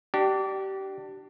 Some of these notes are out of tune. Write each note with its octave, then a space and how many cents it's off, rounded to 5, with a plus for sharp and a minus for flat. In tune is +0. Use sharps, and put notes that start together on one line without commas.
D4 +15 G4 -25